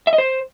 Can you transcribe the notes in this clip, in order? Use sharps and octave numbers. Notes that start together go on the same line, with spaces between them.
E5
D#5
C5